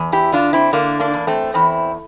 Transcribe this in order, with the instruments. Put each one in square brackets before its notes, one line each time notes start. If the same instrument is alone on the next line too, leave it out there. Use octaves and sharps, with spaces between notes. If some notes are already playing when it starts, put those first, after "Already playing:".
Already playing: [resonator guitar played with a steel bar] E2
E4 G4
D3 D4 F4
C4 E4
D3 A#3 D4
A#3 D4
E2
A3 C4
E2 C4 E4